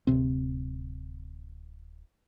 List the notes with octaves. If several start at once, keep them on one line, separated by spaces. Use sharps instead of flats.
D1 C2 C3 C4